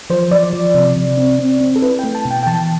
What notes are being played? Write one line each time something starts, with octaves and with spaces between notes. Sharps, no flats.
F3 C5
F3 D5
F3
C3
C3
C4
C4
C4
A4
E4 B4
A3 G5
A5
B2
G5
G5
E3 A5